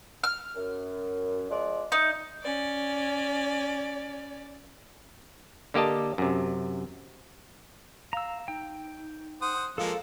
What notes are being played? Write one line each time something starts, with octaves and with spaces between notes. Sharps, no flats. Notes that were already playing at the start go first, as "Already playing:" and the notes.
F6
F#2
F3 G#3 D5
D#4 E5 D#6
C#4 D5
D3 A#3 G4 D#5 A5
F#2 C3
F5 A#5 E6
D#4 G5
C5 F#5 D#6
F3 G#3 A#3 A4 F5